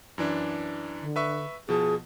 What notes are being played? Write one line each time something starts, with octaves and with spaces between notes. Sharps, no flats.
F#2 E3 D4
D3
B4 E5 C#6
B2 F3 G#4 A5